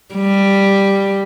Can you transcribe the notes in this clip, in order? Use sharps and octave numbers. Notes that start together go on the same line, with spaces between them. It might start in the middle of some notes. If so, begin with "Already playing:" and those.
G3